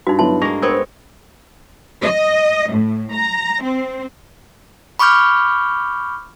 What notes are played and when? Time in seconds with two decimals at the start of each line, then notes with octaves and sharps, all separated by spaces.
0.07 G2 D#4 F#4
0.19 F#3 B3 E4 A5 C6
0.42 G#3 A#3 C#6 A#6 F7
0.62 B3 C4 A#4 C#5
2.02 D#5
2.72 A2
3.12 A#5
3.62 C4
4.99 B5 C#6 D6 F6 G6